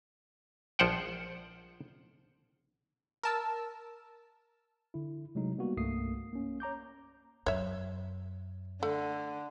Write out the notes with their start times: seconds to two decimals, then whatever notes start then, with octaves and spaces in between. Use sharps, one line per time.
0.79 A#1 F3 C5 F#5 G5
3.23 A#4 A5 E6
4.94 D3 E4
5.35 C3 F#3 G#3 A3 D#4
5.58 G3 A#3 B3 F#4
5.77 C2 G2 A3 A#3 D#6 C7
6.33 A#3 C#4
6.60 C#5 A#5 D6 G6
7.46 F#2 C#5 E5
8.83 D3 A3